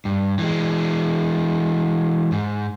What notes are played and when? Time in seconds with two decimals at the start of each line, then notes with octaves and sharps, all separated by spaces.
0.05 G2
0.39 E3 G#3
2.32 G#2